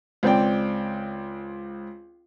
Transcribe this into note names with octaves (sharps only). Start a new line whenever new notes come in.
C#2 C4 D5 G5